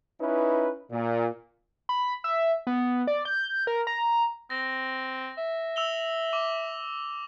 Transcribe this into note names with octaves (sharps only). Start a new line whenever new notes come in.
C#4 D#4 E4 B4
A#2
B5
E5
B3
D5
G6
A#4
A#5
C4 A#6
E5
E6 F7 G7
D6